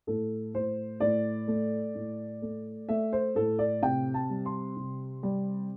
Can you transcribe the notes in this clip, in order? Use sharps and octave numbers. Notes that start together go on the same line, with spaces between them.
A2 A4
A2 C5
A2 D5
A3
A2
A3
A3 E5
C5
A2 A4
D5
C3 G5
A5
G3
C6
C3
G3